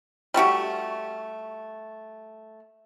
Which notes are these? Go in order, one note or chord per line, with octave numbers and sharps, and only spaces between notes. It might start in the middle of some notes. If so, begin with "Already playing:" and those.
G3 A3 F#4 G4